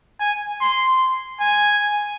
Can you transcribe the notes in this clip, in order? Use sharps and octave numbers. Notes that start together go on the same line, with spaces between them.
G#5
C6
G#5